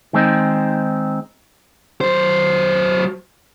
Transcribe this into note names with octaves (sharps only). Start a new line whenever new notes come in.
D#3 G#3 C4 D#4
F#3 C5